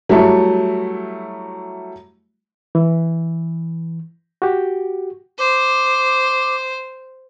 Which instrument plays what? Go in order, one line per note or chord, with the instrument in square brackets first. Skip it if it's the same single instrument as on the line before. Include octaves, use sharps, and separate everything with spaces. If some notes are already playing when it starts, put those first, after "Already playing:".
[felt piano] F#3 G3 A3 E4
[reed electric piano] E3
F#4 G4
[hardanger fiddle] C5 [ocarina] D6